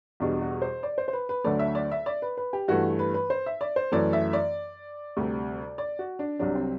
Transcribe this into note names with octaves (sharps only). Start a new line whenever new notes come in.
E2 B2 G3 D4
F#4
C5
D5
C5
C5
B4
B4
D2 D3 F#3 A3 D5
E5
D5
E5
D5
B4
B4
G4
G2 E3 A3 F#4
B4
B4
C5
E5
D5
C5
F#2 E3 A3 D5
E5
D5
D2 C3 G3
D5
F#4
D4
C2 C3 F#3 D4
C4